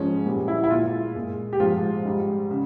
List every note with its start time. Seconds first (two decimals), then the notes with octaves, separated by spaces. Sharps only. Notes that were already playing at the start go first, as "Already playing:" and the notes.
Already playing: G#2 F3 G#3 C#4
0.25 A#2 G3
0.48 E4
0.64 E4
0.70 A#2 G#3 F4
1.15 A#2 G#3
1.53 G4
1.60 G#2 F3 G#3 F4
2.05 G#2 G3
2.51 C#3